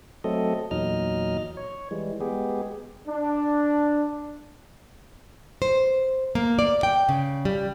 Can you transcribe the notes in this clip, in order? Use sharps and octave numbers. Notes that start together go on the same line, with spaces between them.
F#3 A3 C4 A4 D#5
E2 A#2 F#3 D#4 D#5 F6
C#5
E3 G3 G#3
G#3 B3 G4 G#4
D4
C5
A#3
D5
G5
C#3
G3